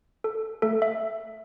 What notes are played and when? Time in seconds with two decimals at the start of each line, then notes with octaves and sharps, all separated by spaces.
0.24 A4
0.62 A3 A4
0.82 E5